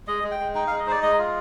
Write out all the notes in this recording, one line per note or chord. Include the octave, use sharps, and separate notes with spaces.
G#3 D#5
G#3
G5
G#3
D#4 G5
F5
G#3
D#5
D#4 C5 D5
G#3 D#5
F4